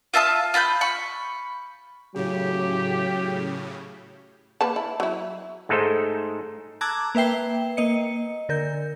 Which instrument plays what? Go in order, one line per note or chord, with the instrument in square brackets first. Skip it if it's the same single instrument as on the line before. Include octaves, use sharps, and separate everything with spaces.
[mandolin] F4 E5 A5 D#6
F4 B5 F#6 G6
B5 C#6
[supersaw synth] A2 C#3 [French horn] F#3 [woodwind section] G4
[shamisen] A#3 B4 A5
E4
F#3 E4
[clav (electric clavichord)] G#2 G#3 A3 D#4 A4 C5
[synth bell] A5 A#5 D6 E6 F#6 G#6
A#3 B4 E5 G5 C7
A#3 D#5 C#7
D3 A#4 G6